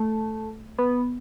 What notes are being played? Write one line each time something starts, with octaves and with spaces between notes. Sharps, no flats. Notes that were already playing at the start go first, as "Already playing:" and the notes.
Already playing: A3
B3